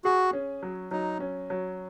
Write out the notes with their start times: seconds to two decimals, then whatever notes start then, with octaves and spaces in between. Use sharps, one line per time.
0.04 F#4 G#4
0.33 C#4
0.63 F#3
0.91 F#3 D#4
1.20 C#4
1.50 F#3